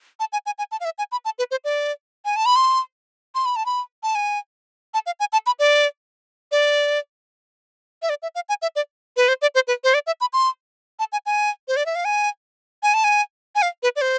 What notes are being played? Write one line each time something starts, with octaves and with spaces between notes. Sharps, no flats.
A5
G#5
G#5
G#5
A5
F5
E5
G#5
B5
A5
B4
C5
D5
G#5
A5
B5
C6
C6
B5
A5
B5
A5
G#5
A5
F5
G#5
A5
B5
D5
D5
E5
D5
E5
F5
G#5
E5
D5
B4
C5
D5
C5
B4
C5
D5
E5
B5
C6
A5
G#5
G#5
C5
D5
E5
F5
G#5
G#5
A5
G#5
G#5
F5
B4
D5
C5